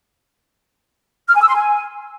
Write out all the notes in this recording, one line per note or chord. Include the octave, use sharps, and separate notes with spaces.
F6
G#5
E6
C6
G#5